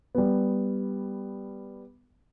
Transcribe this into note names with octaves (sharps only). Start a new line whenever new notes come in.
G3 B3